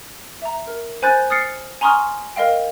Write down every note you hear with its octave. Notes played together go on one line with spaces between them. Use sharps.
E5 A#5
A#4
C5 G#5 B5 F#6 G6 A6
D#6 F6 A6 C7 C#7
G#5 A#5 C6 C#6 D#6 F6
A#4 D#5 F5 G5